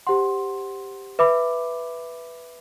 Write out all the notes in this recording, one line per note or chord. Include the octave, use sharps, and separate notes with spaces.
G4 C5 F#5 C6
B4 E5 B5 D6